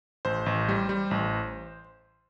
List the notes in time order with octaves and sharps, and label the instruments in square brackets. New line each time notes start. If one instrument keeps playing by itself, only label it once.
[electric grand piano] A1 C5
A1
G3
G3
A1